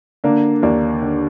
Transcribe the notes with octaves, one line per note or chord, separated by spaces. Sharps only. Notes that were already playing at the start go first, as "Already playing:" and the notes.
D3 A#3 D4
D#2 A#3 D4
D3